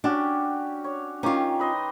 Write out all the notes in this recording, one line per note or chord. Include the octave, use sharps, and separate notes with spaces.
C#4 D4 F#4 G4
C#5
D#3 C#4 F4 G4 C#6
B4 D#5 C6